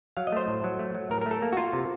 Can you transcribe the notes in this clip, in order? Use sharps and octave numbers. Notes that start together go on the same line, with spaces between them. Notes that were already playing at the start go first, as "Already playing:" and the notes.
F#3 F5
D#5
A3 C5
A2
F#3
A3
F#3
A2 A#4
A3 A#4
A4
A#3
F#4
A#3 F4
C3